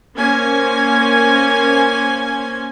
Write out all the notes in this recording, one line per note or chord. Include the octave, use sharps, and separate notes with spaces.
A#3 C#4 C5 G#5